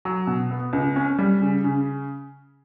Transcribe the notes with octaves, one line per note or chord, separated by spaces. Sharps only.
F#3
B2
B3
C#2
C#4
G3
C#3
C#3